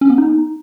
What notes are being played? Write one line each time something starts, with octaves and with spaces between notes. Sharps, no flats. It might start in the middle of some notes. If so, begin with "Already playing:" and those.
C#4
B3
D#4